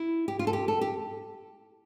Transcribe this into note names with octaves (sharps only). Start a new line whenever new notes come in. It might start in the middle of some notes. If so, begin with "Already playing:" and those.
Already playing: E4
G4
F4
A4
G4
A4
G4